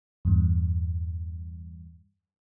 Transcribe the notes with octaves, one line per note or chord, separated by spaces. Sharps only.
E2 G2